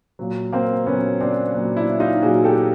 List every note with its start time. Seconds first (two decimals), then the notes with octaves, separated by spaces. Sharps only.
0.19 A#2 F#3
0.52 A#3 C4
0.87 A#2 F#3 B3 C#4
1.21 C4 D4
1.54 A#2 F#3
1.77 D4 E4
2.00 D#4 F4
2.22 A#2 F#3 F#4 G#4
2.44 G4 A4